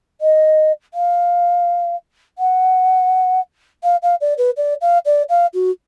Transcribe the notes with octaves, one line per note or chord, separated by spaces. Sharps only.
D#5
F5
F#5
F5
F5
D5
B4
D5
F5
D5
F5
F#4